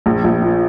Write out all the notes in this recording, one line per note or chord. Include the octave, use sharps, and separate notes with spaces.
A#1
A#1
A#2